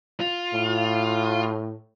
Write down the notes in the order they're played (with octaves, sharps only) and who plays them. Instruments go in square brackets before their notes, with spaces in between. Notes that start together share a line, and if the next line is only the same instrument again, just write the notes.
[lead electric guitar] F4
[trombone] A2